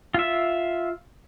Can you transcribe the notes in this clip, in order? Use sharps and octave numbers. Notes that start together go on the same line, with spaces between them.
F4 E5